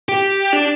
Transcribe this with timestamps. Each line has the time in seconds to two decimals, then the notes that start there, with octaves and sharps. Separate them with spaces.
0.09 G4
0.53 D4